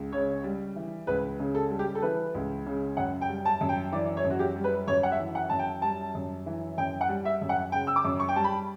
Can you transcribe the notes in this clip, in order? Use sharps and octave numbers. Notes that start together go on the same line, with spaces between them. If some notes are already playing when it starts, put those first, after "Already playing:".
Already playing: C#2
C#3 C#5
G3
E3
C#2 B4
C#3
A4
G3
G4
A4
E3 B4
C#2
C#3
F#2 F#5
G5
G3
A5
F#2
G5
E3 D5
C#5
F#2
F#4
G4
G3
B4
F#2 C#5
F#5
E5
E3
F#5
F#2 A5
G5
G3 A5
F#2
E3
F#2 G5
F#5
G3
E5
F#2
F#5
C#3 G5
E6
D6
F#2
C#6
G5
G3 A5
B5